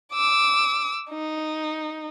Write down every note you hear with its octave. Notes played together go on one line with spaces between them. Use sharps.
D6 E6
D#4